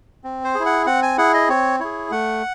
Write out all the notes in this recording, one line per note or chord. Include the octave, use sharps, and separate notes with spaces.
C4
C5
E4 G#4
F#5
C4 F#5
G#5
E4 G#4 F#5
D#5
C4 C#5
E4 G#4 C#5
A3 F#5